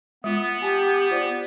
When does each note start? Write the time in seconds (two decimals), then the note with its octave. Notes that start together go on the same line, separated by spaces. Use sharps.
0.24 G#3 B3 F4
0.62 G4 G#5 A5
1.11 F4 C5 D5